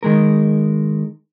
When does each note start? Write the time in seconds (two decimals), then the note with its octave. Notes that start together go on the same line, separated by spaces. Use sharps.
0.03 D#3 G#3 A#4